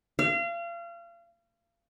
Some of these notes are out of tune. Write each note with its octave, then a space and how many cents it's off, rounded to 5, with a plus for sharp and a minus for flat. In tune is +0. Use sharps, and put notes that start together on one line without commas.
F5 -35